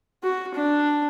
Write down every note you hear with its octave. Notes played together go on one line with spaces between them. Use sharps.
F#4
D4